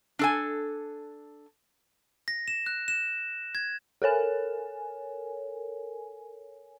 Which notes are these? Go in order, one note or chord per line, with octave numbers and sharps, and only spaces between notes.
D4 A4 G#5
A#6
E7
F#6
E7
G#6
A4 A#4 C#5 G#5